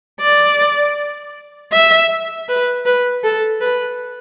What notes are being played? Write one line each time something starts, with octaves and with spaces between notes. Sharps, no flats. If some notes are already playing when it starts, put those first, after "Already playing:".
D5
E5
B4
B4
A4
B4